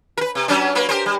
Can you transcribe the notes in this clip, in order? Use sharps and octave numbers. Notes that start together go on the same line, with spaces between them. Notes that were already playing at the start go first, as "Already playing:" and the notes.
A#4 B4
C3
F#3 C#4 D4
F#3 A#3 B4
G4 A#4 C5
G3